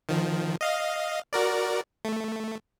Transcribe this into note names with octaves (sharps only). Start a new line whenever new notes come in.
D#3 F3
D#5 F5
F#4 A#4 D5
A3